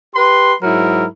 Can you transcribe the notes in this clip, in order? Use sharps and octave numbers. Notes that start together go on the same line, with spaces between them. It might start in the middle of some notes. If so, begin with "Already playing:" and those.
G4 B4 C6
G#2 F#3 E4 A#4